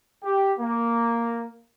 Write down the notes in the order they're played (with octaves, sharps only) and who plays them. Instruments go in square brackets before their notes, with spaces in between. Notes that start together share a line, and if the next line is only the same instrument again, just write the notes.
[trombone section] G4
A#3